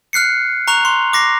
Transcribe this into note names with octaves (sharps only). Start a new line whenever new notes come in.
F6 F#6 C7 C#7
A#5 C#6 F#6 F7
C6
D6 A#6 C7